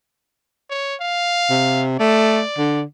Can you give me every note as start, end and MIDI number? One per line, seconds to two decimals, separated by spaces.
0.70 0.96 73
1.01 1.84 77
1.50 1.99 48
2.00 2.42 57
2.00 2.82 74
2.58 2.83 50